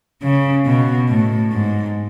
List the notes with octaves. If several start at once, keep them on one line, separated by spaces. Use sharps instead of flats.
C#3
B2
A2
G#2